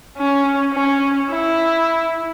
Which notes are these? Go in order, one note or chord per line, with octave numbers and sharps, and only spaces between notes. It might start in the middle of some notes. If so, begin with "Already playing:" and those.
C#4
C#4
E4